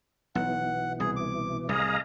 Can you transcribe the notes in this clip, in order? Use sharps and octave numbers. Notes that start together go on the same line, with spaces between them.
B1 B2 E3 F#5
C2 G#4
D6
C2 A2 G#4 D#5 F5 A#5